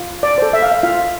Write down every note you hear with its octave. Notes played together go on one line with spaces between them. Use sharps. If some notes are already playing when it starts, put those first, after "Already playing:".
Already playing: F4
D5
A4 C5
E5
F5
E5
F4 F5